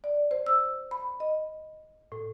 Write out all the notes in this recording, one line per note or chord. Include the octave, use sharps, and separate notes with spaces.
D5
C5
E6
B5
D#5
A2